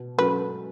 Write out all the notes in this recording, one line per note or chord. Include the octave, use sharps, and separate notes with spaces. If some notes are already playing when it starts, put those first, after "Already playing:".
Already playing: B2
F#3 C#4 F#4 A4 B4